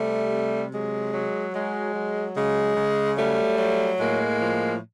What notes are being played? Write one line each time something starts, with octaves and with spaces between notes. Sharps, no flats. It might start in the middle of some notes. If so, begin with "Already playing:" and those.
Already playing: C3 G3 A3
C3
F#3 G#3
F#3
F#3 G#3
F#3
C#3 G#3
C#3
F#3 G3 A3
F#3
A2 G#3 A#3
F3